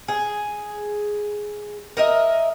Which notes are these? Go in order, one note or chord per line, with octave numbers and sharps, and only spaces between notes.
G#4
A#4 D#5 E5